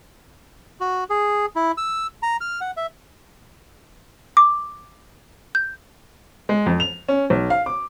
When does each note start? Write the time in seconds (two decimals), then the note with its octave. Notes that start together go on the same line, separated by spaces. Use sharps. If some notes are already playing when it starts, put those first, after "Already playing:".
0.81 F#4
1.10 G#4
1.56 E4
1.77 E6
2.22 A#5
2.41 F6
2.61 F#5
2.77 E5
4.37 D6
5.55 G6
6.49 G#3
6.66 F2
6.80 F7
7.08 C#4
7.30 B1
7.50 F5
7.66 D6